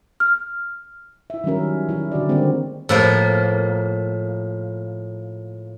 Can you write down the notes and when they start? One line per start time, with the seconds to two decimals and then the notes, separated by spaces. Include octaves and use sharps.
0.20 F6
1.30 E4 E5
1.44 D#3 F#3 G3 C#4 A#4
1.89 E3 E4
2.12 D3 F#4 G#4 D5
2.29 D3 D#3 G3 G#3 A#3 C4
2.89 A2 F3 A#3